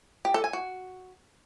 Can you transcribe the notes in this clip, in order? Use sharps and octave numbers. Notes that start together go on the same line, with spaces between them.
G4
A4
G#5
F#4